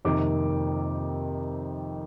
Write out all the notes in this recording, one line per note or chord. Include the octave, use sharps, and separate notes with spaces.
F2 C3 D#3 A#3 D6